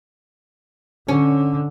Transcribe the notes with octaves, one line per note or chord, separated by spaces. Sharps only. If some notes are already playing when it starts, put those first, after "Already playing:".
D3 C#4